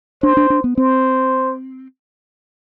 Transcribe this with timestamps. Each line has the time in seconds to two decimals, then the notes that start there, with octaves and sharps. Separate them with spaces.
0.23 D4 C5
0.37 D4
0.50 D4
0.64 B3
0.78 C4 C5